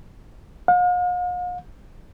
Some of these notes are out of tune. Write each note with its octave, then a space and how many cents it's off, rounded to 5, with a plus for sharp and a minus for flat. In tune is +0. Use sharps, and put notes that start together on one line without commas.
F5 +45